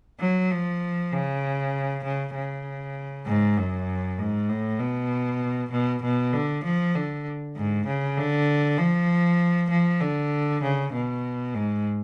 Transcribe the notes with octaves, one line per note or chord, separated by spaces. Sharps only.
F#3
F3
C#3
C#3
C#3
G#2
F#2
G#2
A2
B2
B2
B2
D3
F3
D3
G#2
C#3
D3
F3
F3
D3
C#3
B2
G#2